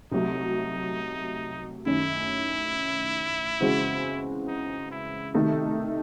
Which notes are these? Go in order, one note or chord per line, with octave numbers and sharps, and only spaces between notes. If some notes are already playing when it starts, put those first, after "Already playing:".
C2 C3 F#3 A3 D#4
F#2 D#3 A3 C#4 E4
C#3 E3 G#3 C4 F#4
D#4
E4
C3 D#3 A3 D#4 A4